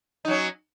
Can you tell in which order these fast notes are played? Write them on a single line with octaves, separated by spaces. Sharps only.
D#4 F#3 C#4